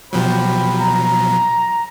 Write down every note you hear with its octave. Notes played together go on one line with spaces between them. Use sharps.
B2 F3 F#3 G4 C5 B5
A#5